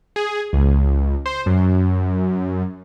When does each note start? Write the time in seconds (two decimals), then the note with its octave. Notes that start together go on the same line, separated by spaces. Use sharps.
0.16 G#4
0.53 C#2
1.26 C5
1.46 F#2